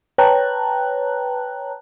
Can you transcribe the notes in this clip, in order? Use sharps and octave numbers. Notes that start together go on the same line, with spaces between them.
B4 C#5 G5 A5 A#5 F#6